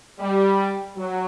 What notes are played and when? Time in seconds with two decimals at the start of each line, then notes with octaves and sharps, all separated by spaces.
0.20 G3
0.96 F#3